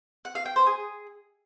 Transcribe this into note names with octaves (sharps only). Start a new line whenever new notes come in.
F#5
F5
G5
C5
G#4